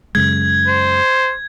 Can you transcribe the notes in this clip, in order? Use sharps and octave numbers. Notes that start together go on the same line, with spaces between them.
F#2 C#3 G#3 G#6
C5